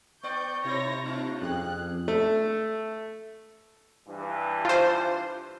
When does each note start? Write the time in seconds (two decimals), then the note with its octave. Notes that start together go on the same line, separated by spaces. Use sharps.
0.23 B3 D5 C#6 G6
0.65 C3 D#4 E4 C5 C#5 A#6
1.05 A3 D4 D#4 F4
1.42 F2 C#4 G4 G#4 F#6
2.08 A3
4.08 G2 E3
4.65 F4 C5